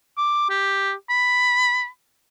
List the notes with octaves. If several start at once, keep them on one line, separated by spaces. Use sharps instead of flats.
D6
G4
B5